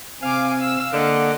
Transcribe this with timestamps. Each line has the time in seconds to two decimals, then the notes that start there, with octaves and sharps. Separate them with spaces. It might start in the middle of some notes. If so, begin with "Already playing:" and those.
0.22 C3 C4 F5 G#5 D6
0.61 E6
0.93 D3 A#3 D#5 F#5 D6